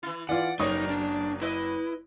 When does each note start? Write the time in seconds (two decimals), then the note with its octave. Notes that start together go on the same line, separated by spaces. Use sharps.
0.03 E3 E4
0.29 E3 F4 D5 F#5
0.59 F#1 F#3 D#4 A#4 C#5 D#6
0.89 D4
1.42 E4 B4 D#5